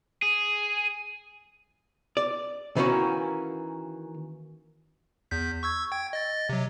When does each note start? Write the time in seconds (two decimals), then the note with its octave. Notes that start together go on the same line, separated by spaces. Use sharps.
0.22 G#4
2.17 D5
2.76 D#3 E3 A#3 C#4 F#4
5.31 E2 G6 B6
5.63 C#6 E6 G#6
5.91 G5 G#6
6.13 D#5 A6
6.49 C3 F#3